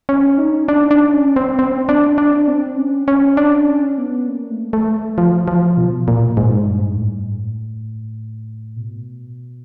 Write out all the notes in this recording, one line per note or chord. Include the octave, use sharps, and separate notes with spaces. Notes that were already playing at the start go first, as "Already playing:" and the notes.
C#4
D#4
D4
D4
C#4
C4
C4
D4
D4
C4
C#4
C#4
D4
C#4
B3
A#3
A3
A3
F3
F3
B2
A#2
G#2
G2
A2
B2